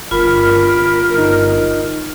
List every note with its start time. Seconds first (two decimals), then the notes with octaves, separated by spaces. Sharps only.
0.11 G1 F4 A#4 B5
1.17 D#4